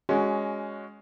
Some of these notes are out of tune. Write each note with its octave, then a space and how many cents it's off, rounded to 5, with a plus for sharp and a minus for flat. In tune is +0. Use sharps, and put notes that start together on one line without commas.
G#3 +0 C#4 +10 F#4 +0